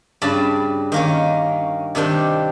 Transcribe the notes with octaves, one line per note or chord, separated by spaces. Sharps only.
G2 C#3 D5 A5 B5
D#3 A#3 C#4
C3 D#3 G3 D4